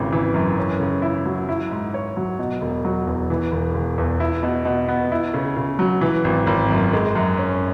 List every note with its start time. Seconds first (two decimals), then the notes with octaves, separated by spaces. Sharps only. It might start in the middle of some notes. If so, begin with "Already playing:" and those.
Already playing: G#1 C#3 E3
0.12 E3
0.34 F#2
0.58 C#4
0.80 C#3
1.02 E4
1.26 F#3
1.49 E4
1.71 G#2
1.94 C#5
2.17 F#3
2.39 B2
2.61 E1
2.85 F#3
3.07 E2
3.30 E3
3.52 E1
3.74 E1
3.98 E2
4.20 E4
4.43 B2
4.65 B2
4.88 B3
5.12 E4
5.34 C#3
5.57 C#3
5.79 F#3
6.01 E3
6.24 G#1
6.47 G#1
6.70 F#2
6.93 G#3
7.15 F#2
7.37 C#4